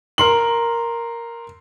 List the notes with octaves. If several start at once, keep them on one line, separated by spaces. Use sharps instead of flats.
A#4 C6 F#7